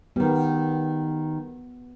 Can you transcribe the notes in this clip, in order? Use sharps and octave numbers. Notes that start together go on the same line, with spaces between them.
D#3 G3 B3